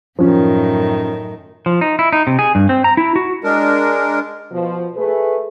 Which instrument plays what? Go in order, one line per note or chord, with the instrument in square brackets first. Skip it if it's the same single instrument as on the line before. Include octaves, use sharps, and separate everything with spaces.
[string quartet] F#2 A2 D#3 [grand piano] F3 C#4
[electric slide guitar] F3
D#4
E4
D#4
C3
G#4
G2
C4
A#5
E4
F#4
[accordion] G#3 D4 A#4
[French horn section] B2 F3
A3 G#4 B4